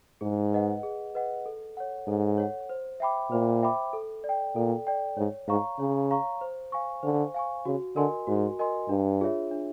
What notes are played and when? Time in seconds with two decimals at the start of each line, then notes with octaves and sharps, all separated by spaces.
0.21 G#2 G#4
0.53 B4 D#5 F#5
0.83 G#4
1.15 B4 D#5 F#5
1.46 A4
1.77 C#5 F#5
2.08 G#2 A4
2.38 C#5 F#5
2.69 C5
3.00 E5 G5 B5 D6
3.31 A#2 C5
3.63 E5 G5 B5 D6
3.93 A4
4.24 D5
4.29 G5
4.55 A#2 A4
4.87 D5 G5
5.17 G#2 C#5
5.48 G#2 F5 A#5 C#6
5.79 C#3 C#5
6.11 F5 A#5 C#6
6.41 C5
6.72 F5 G#5 C#6
7.03 D3 C5
7.34 F5 G#5 C#6
7.65 C#3 F#4
7.96 D3 A#4 D#5 G#5 C6
8.27 G#2 F#4
8.59 A#4 D#5 G#5 C6
8.89 G2 D4
9.21 F4 G#4 C#5 E5
9.51 D4